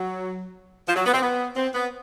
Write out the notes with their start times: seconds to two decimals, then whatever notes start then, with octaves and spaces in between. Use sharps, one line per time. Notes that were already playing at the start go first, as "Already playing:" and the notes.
Already playing: F#3
0.88 F3
0.96 F#3
1.06 B3
1.14 C4
1.22 B3
1.56 C4
1.75 B3